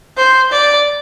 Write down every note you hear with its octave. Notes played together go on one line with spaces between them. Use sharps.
C5
D5